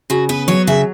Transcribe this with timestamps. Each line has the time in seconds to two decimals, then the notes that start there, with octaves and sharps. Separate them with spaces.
0.10 C#3 F#4
0.29 B3 B4
0.48 F#3 C#5
0.67 C#3 E5